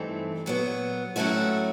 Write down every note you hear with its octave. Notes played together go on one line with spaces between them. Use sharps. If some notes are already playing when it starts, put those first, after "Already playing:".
Already playing: G2 E3 A3 C4 D#4
A#2 F#3 B3
A2 F#3 A3 C#4 E4 F#4